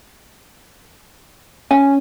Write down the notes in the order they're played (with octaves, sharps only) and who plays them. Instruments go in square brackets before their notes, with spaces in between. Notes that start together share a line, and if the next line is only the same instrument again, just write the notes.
[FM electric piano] C#4 [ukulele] G#5